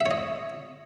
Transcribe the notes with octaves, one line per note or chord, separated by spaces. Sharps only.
E5
C#5
D#5